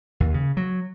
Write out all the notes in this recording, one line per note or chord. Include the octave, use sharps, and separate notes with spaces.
D#2
C#3
F#3